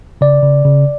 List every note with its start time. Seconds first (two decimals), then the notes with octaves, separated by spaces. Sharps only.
0.21 C#3 D5
0.43 C#3
0.65 C#3